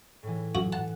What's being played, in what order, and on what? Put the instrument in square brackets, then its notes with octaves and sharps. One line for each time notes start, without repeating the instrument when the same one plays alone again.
[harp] A2 E3
[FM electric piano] F#2 [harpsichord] F#4
[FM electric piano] F#5 [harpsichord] A5